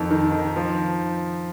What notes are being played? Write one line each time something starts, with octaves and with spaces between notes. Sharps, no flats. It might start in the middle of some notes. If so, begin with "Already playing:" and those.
Already playing: F2 D#3
D#3
D#3
F3